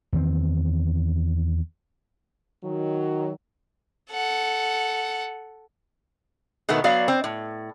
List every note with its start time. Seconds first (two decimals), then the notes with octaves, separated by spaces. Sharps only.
0.13 E2 D#3 C4
2.64 D#3 F#3
4.11 A4 F#5
6.69 B2 D#3 A3 B3
6.84 F#3 B3 D5 F5
7.08 C4
7.24 A2